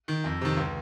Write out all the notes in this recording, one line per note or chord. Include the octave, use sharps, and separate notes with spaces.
D#3
F2
C3 D#3
C#2